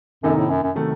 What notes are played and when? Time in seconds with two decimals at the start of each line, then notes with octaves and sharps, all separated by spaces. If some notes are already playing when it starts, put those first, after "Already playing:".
0.23 F#2 C3 D#3 A#3 D#4 A4
0.37 A2
0.49 F#2
0.63 F#2
0.75 C3 D#3 F#3 A3